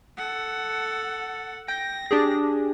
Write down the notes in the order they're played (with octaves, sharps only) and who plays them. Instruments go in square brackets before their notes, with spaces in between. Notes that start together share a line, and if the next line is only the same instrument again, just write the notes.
[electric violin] A4 F#5
[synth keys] G5 [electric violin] A#6
[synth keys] D4 G4 G#4